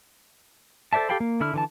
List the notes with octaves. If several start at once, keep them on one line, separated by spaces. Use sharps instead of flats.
A4 C5 D5 E5 A5
G4 A4 F5 G5 B5
A#3
D3 E4 B5 F6
D3 E3 A5